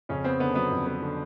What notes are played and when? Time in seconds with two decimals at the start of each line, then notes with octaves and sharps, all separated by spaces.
0.09 F2 C#3 C#4
0.24 B3 C4
0.40 D3 B3
0.55 F#3 B3
0.71 F2
0.86 B3
1.02 D3